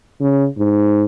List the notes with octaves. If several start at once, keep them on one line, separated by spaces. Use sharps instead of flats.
C#3
G#2